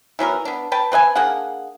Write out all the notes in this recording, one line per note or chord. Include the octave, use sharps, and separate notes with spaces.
E3 F#3 B3 A#4
B3 D4
B4 G5 A5
C4 B4 D#5 G#5
A#3 D4 G#4 F#5